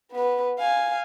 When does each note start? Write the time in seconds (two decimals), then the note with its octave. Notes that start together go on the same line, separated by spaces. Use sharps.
0.11 B3 B4
0.59 F5 G#5